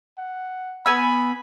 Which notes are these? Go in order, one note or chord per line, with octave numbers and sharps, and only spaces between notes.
F#5
B3 G#5 B5 E6